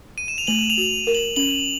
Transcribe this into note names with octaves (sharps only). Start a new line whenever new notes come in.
D#7
E7
F7
A3 F#7
F7
F#4
A#4
F#7
C#4 F#7